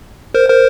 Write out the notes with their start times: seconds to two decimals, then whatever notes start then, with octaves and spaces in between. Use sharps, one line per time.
0.34 A#4 C5
0.49 A#4 C5